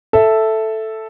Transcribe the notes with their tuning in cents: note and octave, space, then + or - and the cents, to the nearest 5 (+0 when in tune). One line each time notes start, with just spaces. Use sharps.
A4 +0 E5 +0